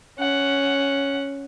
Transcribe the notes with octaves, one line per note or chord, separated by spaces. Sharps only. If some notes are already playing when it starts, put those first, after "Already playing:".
C#4 F#5